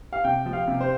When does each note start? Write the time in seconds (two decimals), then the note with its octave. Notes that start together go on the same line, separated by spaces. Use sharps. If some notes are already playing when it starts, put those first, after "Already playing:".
0.13 F5
0.24 C3 G5
0.46 F3
0.53 F5
0.68 C3
0.81 C5